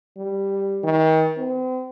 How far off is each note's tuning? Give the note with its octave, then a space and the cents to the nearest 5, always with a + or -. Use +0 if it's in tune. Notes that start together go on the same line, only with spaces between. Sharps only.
G3 +0
D#3 +35
C4 -40